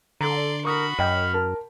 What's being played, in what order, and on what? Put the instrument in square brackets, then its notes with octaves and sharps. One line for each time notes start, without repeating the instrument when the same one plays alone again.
[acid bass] D3 [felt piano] A4 A#5 [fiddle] D5 C6
[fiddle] F#4 B5 [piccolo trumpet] A#4 [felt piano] C#6 D#6
[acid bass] F#2 [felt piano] D#5 G5 [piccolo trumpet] F6
[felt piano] A#4 A5